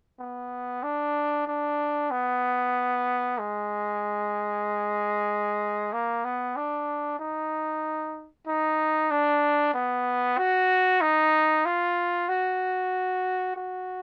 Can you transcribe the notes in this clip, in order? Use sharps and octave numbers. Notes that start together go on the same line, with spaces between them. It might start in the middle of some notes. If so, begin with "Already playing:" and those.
B3
D4
D4
B3
G#3
A#3
B3
D4
D#4
D#4
D4
B3
F#4
D#4
F4
F#4
F#4